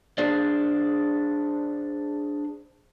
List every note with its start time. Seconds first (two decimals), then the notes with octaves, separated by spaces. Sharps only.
0.18 D4 G#4 C5 D5